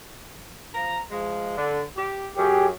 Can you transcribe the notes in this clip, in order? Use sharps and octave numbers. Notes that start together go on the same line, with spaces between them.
F3 A#5
F3 G#3
D3
G4
F#2 G4 G#4